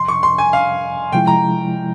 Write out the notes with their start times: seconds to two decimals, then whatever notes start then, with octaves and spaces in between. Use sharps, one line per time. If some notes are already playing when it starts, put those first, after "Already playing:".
Already playing: F2 C3 F3 C6
0.08 C#6
0.23 C6
0.38 G#5
0.53 F5
1.12 C3 F3 G#3 E4 G5
1.27 A#5